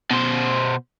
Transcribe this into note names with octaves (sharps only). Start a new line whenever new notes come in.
B2 C5